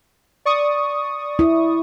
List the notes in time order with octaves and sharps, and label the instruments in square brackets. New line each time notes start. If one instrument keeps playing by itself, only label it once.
[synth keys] D5 C#6 D#6
[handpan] E4